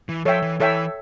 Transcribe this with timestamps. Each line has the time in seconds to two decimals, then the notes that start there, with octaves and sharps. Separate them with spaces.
0.09 E3
0.25 F3 A4 C#5 E5 G5
0.42 E3
0.60 E3 A4 C#5 E5 G5